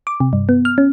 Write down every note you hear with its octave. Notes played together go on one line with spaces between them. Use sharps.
D6
C3
G2
B3
F6
C#4